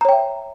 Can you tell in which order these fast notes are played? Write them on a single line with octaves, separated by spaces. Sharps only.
A#5 C#5 G5 E5